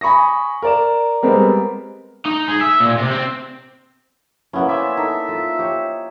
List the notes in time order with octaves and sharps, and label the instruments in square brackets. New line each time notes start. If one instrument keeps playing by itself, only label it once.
[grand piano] G#5 B5 C#6 D#6 A#6
A#4 D5 E7
G3 G#3 B3 C4 A#4
[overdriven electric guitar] D#4
G#4
E5
A#2
C3
C4
[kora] A#3 B3 C#4 [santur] E4
[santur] C5 D5 G#5 [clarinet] E5
[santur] D#4 A4 [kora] A#4
[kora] F4
G4 C#5